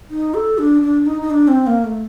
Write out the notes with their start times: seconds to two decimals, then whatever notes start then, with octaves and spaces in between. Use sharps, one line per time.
0.10 D#4
0.34 A4
0.58 D4
0.82 D4
1.06 D#4
1.22 D#4
1.30 D4
1.48 C4
1.67 A#3
1.84 A3